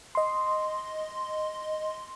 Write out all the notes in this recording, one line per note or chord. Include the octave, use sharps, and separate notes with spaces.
D#5 C6